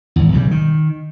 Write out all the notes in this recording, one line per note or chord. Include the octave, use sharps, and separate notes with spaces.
G#1 E2
B1 C#3 E3 G3
D#3